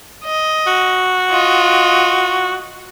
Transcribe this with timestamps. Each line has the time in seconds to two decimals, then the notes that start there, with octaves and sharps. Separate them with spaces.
0.24 D#5
0.67 F#4
1.30 F4 D#5